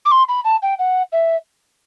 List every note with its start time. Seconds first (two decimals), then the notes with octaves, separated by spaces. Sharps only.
0.05 D6
0.11 C6
0.29 B5
0.45 A5
0.62 G5
0.79 F#5
1.13 E5